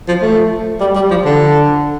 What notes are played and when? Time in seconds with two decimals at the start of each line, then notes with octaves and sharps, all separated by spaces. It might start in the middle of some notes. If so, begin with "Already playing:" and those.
0.08 F3
0.22 A3
0.81 G3
0.95 G3
1.10 F3
1.25 D3